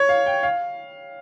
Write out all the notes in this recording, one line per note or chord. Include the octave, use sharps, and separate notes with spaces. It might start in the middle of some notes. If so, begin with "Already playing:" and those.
Already playing: C#5
F5
G5
F5